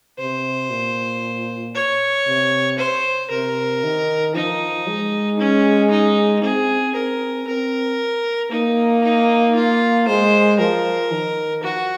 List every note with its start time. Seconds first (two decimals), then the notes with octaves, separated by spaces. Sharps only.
0.18 C3 C5
0.70 A#2
1.75 C#5
2.27 C3
2.79 C5
3.30 C3 A#4
3.84 D#3
4.35 F3 D#4
4.87 G#3
5.40 C#4
5.91 D#4
6.43 C4 G#4
6.95 C4 A#4
7.47 C4 A#4
8.51 A#3 D#4
9.03 D#4
9.55 F4
10.08 G#3 C5
10.59 F3 A#4
11.11 D#3
11.63 F3 F#4